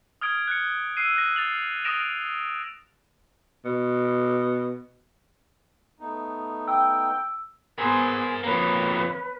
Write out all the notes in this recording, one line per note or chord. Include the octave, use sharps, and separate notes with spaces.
D#6 F6 G#6 D7
F#6 C#7
E6 F#6 C7 D#7
F#6 A#6
F6 A6 F7 F#7
D#6 F6 A#6 D7 E7 F7
B2
A3 B3 D#4
G5 E6
B3 G#4 A#4 C5 G#5
F2 A#3 B4 C#5